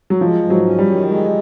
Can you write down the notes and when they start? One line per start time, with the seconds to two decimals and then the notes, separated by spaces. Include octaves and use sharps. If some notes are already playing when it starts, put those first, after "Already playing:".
0.10 F#3
0.21 F3 G#3
0.43 G#2
0.50 F#3
0.65 C#4
0.79 G3
0.87 D#3
1.08 G#3